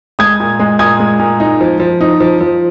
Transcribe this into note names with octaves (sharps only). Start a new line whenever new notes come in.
G#3 D#6 G#6
A#2
G#3
A#2 D#6 G#6
G#3
A#2
D#4
F3
F3
D#4
F3
F3